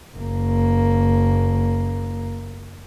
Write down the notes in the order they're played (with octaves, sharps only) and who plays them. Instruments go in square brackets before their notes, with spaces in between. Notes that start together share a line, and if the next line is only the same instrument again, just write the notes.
[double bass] F#1 A#3